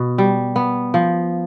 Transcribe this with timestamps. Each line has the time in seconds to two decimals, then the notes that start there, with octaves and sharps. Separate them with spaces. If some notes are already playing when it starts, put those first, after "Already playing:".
Already playing: B2
0.18 G3
0.56 B3
0.94 F3